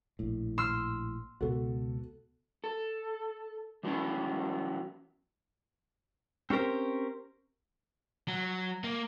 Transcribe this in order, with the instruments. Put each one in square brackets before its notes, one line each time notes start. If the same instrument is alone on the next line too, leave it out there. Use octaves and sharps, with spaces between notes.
[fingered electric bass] A#1 A2
[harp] C6 E6 F6
[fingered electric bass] C#2 B2 B3 [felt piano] F#4 A4
[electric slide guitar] A4
E3 F#3 B3 C#4 E4
[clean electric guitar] C4 C#4 G4 A#4 C5
[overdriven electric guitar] F#3
A#3